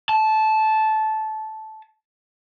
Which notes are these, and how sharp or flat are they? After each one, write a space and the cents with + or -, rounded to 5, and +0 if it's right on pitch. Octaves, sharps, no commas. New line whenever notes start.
A5 -15